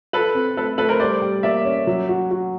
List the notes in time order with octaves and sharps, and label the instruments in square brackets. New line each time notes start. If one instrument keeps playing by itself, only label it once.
[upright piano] F4 [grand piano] A4 B4
[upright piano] C4
[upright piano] A3 [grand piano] A4 B4
[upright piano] A3 [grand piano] A4 B4
[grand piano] A#4 C5
[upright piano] G3 [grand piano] C5 D5
[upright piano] G3
[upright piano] A#3 [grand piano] D5 E5
[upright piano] C#4
F#3
F#4
F#4